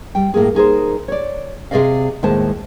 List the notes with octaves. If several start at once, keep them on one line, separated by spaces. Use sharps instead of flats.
G3 G5
A2 A#3 G#4
D#4 G#4 A#4 C5
C#5 D5
C3 F3 G#4 D5 D#5 F5
D#2 A2 G#3 C5 A5